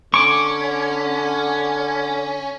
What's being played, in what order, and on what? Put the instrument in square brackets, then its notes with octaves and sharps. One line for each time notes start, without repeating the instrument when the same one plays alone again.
[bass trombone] D3 [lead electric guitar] C#4 [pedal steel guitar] C#6 D6